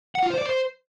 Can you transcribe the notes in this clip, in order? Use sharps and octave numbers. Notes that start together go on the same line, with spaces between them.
F#5
F4
C5
D5
C5